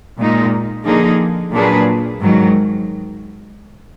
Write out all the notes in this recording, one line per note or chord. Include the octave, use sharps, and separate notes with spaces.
A#2 G#3 D#4
D3 F3 A#3 D#4 G#4
A#2 F#3 D4 G#4 B4
G#2 D#3 F#3